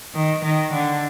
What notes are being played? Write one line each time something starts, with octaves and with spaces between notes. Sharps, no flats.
D#3
D#3
D3